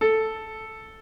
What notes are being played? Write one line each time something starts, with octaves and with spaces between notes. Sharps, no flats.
A4